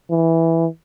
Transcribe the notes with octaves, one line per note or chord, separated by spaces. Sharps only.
E3